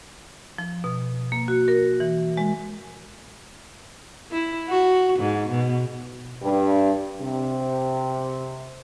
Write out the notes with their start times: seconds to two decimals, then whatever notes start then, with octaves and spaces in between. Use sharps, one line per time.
0.58 F3
0.84 B2
1.32 A#3
1.48 F#4
1.68 A#4
2.00 E3
2.37 G#3
4.32 E4
4.68 F#4
5.19 G#2
5.49 B2
6.42 G2
7.21 C3